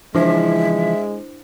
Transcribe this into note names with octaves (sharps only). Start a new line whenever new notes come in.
C#3 E3 F3 G#3 D4 E4 C5 E5